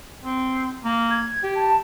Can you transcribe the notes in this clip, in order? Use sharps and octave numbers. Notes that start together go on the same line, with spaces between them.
C4
A#3
G#6
G4
A5